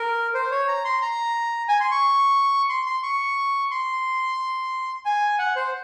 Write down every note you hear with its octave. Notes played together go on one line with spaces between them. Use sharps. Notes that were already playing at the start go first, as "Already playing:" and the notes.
Already playing: A#4
C5
C#5
A#5
C6
A#5
G#5
C6
C#6
C6
C6
C#6
C6
G#5
F#5
C5